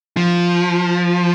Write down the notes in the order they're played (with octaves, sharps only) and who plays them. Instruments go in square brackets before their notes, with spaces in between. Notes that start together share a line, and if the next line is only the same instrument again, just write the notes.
[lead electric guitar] F3